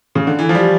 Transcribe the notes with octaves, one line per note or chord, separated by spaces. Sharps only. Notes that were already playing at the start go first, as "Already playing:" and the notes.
C#3
D3
E3
F3
G3